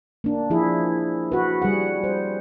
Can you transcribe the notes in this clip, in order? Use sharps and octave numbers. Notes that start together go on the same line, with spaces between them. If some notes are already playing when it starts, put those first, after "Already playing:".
A#3 D4
F3 E4 G#4
F#4 B4
G3 G#4 F#5
C5